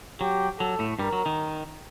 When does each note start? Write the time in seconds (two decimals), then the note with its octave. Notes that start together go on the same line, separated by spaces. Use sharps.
0.20 F#3 G4
0.59 F#3 A4
0.79 A2 A3
0.99 G2 G3 A#4
1.13 F#3
1.26 D#3